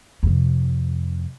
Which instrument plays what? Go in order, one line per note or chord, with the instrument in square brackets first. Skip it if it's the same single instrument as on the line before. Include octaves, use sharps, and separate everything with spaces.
[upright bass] F2 C3